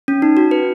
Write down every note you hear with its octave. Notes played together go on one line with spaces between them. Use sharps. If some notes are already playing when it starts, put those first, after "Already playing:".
C#4
D#4
F#4
B4